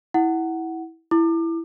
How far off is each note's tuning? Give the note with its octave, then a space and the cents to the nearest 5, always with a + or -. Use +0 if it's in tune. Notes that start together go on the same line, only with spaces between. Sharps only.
E4 -15 F#5 +10
E4 +10 D6 +30